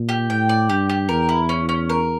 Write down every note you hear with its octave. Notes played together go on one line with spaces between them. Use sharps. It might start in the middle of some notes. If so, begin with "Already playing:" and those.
Already playing: A#2
G4
A2 G5
D5
G2 G4
G4
E2 A#4
E4
C#4
C#4
A#4